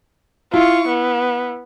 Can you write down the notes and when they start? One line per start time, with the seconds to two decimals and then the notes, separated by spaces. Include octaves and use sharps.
0.54 E4 F4 C#6
0.88 B3